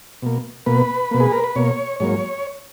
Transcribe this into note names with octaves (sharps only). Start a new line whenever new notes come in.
B2 A#3
B2 A#3 B4
B2 A#3
G#4
A#4
B4
B2 A#3 C#5
G#2 F#3 A#3 C#5